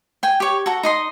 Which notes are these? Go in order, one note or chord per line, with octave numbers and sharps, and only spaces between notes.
G5 G#5
G4 C#5
F#4 A4 A#5
D#4 D#5 C6